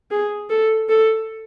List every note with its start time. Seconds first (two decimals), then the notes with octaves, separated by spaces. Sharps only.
0.11 G#4
0.50 A4
0.89 A4